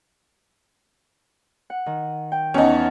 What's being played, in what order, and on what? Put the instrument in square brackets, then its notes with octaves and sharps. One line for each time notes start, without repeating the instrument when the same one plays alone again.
[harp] F#5
D#3
G5
[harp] E2 F#5 A5 [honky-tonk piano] C#4 D#4